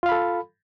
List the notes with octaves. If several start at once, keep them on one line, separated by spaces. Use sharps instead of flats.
F4 A4 F5 B5